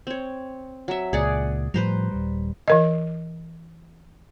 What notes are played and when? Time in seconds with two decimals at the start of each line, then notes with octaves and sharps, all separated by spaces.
0.07 C4 C#5
0.88 F#3 E5
1.13 C#2 A#2 G#4 D5 F#5
1.74 A2 F3 G3 B4 C5 A#5
2.11 D#1 G3
2.68 E3 A#4 D#5